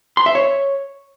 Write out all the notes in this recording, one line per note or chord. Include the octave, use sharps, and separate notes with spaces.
C6
E5
C#5